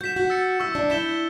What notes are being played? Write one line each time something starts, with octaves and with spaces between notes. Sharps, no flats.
F#4 G6 B6 E7
F#4
E6 A6 C#7
E4 C#6 E6 B6
D4
E4 G6 B6 E7 G7